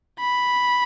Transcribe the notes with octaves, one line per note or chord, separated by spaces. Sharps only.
B5